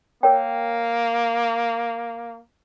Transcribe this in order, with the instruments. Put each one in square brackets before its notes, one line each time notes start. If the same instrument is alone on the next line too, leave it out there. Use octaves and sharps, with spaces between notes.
[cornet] A#3 [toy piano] A#4 C#5 G5